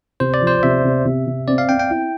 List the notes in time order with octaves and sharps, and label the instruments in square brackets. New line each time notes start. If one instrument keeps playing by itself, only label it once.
[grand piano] C3 [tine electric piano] C5
[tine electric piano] D5
[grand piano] F3
[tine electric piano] C5
[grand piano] C3 [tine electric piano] E5
[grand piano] C3
C3
C3
[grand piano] C4 [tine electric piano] D5
[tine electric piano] F5
[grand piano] C4 [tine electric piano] G5
[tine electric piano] G5
[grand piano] E4